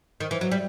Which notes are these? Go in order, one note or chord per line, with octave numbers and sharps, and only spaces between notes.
D#3
E3
F#3
G3